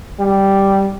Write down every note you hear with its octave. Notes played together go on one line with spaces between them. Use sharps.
G3